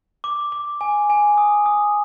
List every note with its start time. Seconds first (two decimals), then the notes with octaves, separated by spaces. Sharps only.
0.24 D6
0.52 D6
0.81 G#5
1.10 G#5
1.38 D#6
1.66 D#6